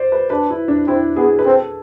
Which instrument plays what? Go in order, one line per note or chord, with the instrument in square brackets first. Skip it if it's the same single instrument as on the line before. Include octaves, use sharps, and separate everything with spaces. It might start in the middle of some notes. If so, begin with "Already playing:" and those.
Already playing: [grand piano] C5 D5
B4
[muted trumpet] D4 [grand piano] B4
[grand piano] E4
D4
[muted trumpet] C4 [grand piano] E4
[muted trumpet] B3 [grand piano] G#4
[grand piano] B4
[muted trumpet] C4 [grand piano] A4